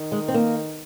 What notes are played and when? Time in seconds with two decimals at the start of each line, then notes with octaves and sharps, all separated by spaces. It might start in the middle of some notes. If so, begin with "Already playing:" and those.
Already playing: D#3
0.12 G#3
0.28 C4
0.34 A#3